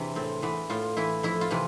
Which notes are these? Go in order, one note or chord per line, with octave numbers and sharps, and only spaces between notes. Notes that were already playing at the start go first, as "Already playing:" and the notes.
Already playing: E2 C3 E3 D4
A2 C4
E3 B3
A2 F4
E3 E4
F2 E4
F4
C3 E3